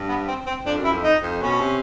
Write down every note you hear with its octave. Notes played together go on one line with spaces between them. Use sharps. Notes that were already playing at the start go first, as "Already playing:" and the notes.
Already playing: G2
B3
C4
C4
F2 D4
F#2
E4
F2
D#4
F2
B2 C#4
C3